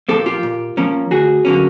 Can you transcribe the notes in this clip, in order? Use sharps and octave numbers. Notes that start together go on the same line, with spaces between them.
A#2 F3 A#3 G4 A4
F4 G4
A#2
F3 A#3 C#4
D2 F#4 G#4
D3 F#3 A#3 C#4